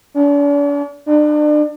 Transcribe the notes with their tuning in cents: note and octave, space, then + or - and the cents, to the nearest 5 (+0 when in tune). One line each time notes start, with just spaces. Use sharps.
D4 -40
D4 +35